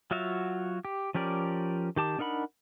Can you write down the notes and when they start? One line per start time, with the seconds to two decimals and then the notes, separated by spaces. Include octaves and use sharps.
0.11 F#3 F4 F#4 E5 F5
0.85 G4
1.15 F3 C#4 G4 A#4 D5
1.96 D#3 G4 A5 D6
2.19 D4 D#4 A#4 F#5 B5